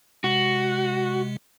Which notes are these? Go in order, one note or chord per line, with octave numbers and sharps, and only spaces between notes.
C3 G#3 F#4